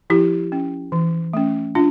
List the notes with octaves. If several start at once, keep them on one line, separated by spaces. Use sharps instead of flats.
F3 E4 G4
C#4
E3
A3 C#4
D4 F4